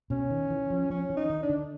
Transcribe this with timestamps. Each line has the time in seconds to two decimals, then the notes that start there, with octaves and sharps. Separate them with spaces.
0.10 B2 C#4
0.30 D#3
0.50 E3
0.70 F3
0.90 F3 C#4
1.10 E3
1.17 D#4
1.30 D#3
1.43 D4
1.49 D3